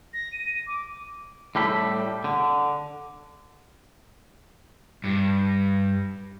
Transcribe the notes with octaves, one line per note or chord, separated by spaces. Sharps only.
A#6
D#7
D6
A2 G3 A4 B5
D3
G2